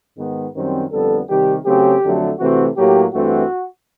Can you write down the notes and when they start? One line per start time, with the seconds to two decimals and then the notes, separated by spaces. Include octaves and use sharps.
0.18 G#2 D#3 G#3 B3
0.55 F#2 D#3 G3 C4
0.91 F2 D3 G3 B3 A4
1.28 C3 D#3 G3 G4
1.65 C#3 F#3 A3 C4 G4
2.03 F2 D3 F#3 A3
2.39 C3 E3 A3 C4 F#4
2.76 A2 F#3 A#3 G4
3.13 G2 E3 A3 C4 F#4